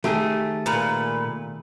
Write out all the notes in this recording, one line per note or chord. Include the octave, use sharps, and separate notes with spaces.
D#3 A3 G4 G#4
A#2 B4